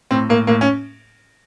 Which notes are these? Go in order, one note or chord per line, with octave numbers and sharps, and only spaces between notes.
A2 C4
A2 A#3
A2 A#3
C#4